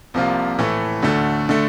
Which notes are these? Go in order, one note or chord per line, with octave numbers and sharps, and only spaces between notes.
C2 C3 F3 A#3 F4
A2 E3 A3
D2 D3 A3
D3 A3